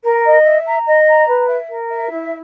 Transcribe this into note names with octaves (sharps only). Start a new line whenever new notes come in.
A#4
D#5
E5
A#5
D#5
A#5
B4
E5
A#4
E5
E4